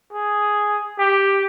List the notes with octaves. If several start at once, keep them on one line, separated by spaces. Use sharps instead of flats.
G#4
G4